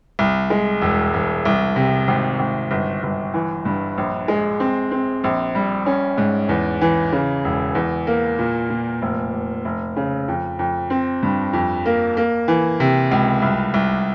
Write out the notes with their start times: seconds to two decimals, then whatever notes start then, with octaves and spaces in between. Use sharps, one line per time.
0.19 C2
0.50 G#3
0.81 E1
1.14 E1
1.45 C2
1.76 C3
2.08 G#1
2.39 G#1
2.71 G1
3.03 G1
3.34 E3
3.65 G2
3.98 A#1
4.28 G#3
4.60 C4
4.91 C4
5.24 A#1
5.55 G3
5.86 C#4
6.18 G#2
6.49 E2
6.81 E3
7.12 C#3
7.44 E1
7.75 E2
8.07 A#3
8.39 A#2
8.70 A#2
9.02 F1
9.33 F1
9.65 F1
9.96 C#3
10.28 F2
10.59 F2
10.90 C4
11.23 G2
11.53 F2
11.86 A#3
12.17 A#3
12.48 E3
12.80 C3
13.12 C#2
13.42 C2
13.74 C2